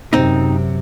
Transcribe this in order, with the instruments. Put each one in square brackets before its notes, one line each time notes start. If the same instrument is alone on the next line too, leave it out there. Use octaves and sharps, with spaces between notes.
[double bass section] F#2 C3 [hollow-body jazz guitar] C4 D#4